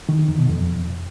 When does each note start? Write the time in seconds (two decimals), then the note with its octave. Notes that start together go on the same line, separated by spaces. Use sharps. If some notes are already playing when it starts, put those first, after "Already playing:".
0.09 D#3
0.19 D#3
0.29 F2
0.39 B2
0.49 F2